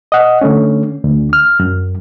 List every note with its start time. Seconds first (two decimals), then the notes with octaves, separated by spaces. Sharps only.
0.12 D#5 F#5
0.41 D3 A3 C#4
1.04 D2
1.33 F6
1.60 F#2